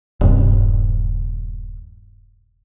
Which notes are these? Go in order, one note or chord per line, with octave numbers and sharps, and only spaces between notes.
D#1 G2 C3